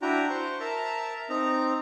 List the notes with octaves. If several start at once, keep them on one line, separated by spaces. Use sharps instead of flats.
D4 E4 F#4 G5 A#5
C5 C6 C#6
A#4 E5 A5 A#5
C4 D#4 A#5